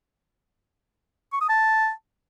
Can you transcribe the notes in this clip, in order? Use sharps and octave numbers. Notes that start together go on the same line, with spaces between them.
C#6
D#6
A5